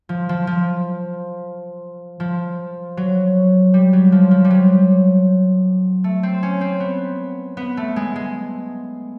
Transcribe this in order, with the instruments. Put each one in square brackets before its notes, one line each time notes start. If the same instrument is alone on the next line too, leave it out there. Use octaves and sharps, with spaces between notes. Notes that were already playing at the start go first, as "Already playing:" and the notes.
[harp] F3
F3
F3
F3
F#3
G3
F#3
F3
F3
G3
F#3
A3
C4
C#4
C4
B3
B3
A3
G#3
G#3